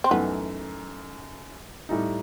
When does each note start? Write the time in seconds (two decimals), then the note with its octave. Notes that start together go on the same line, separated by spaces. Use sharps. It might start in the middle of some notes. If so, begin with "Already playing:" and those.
0.04 C4
0.10 F#2 E3 A3 B3 D#4
1.89 A2 G3 D#4